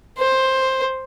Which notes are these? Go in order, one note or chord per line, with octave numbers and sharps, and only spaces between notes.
C5